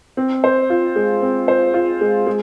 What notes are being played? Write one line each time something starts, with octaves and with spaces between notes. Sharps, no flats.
C4
C5
F4
G#3
C4
C5
F4
G#3
G#3